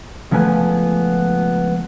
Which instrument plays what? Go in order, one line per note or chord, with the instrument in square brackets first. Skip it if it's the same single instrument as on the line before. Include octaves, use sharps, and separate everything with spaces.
[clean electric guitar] C#2 F3 A3 B3 G#5